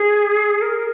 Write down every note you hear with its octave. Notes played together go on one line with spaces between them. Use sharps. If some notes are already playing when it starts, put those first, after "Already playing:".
Already playing: G#4
A#4